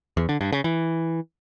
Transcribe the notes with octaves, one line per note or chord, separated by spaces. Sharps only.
E2
D3
G2
C#3
E3